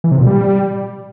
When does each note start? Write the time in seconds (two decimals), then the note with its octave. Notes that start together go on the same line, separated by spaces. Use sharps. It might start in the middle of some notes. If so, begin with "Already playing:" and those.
0.04 E3
0.12 C3
0.19 A#2
0.27 G3